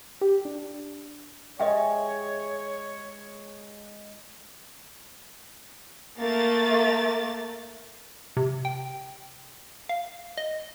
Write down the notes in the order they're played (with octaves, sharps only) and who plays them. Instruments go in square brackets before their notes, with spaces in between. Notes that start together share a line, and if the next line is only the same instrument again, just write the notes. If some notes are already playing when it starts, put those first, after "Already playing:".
[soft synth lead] G4
D4
[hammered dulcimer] G#3 [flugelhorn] C#5 [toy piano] D#5 E5 G5
[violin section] A3 A#3 A6
[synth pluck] C3
G5
F5
D#5